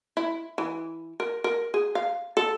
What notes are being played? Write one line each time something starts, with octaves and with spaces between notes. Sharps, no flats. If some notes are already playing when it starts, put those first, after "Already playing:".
E4
E3
A#4
A#4
G#4
F5
A4